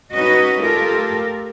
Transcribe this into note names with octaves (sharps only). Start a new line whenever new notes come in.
C#4 D#4 F#4 B4 D#5
A3 F4 G4 A4 A#4